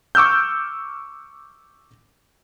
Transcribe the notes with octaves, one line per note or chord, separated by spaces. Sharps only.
C#6 D6 E6 F6 G6